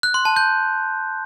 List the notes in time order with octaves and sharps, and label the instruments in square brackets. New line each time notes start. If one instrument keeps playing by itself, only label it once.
[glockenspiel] F#6
C6
A5
G6